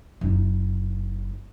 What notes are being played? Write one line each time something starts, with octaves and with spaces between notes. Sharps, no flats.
F#1 D#4